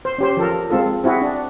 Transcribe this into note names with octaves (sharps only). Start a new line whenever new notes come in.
C5
C#4 G4 C5
F3 A4 A#4
G#3 C4 F4 A4
C4 E4 F#4 G#4
D4